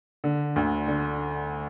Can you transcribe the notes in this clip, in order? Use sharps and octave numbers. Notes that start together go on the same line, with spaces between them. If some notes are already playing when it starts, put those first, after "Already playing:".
D3
D2
D3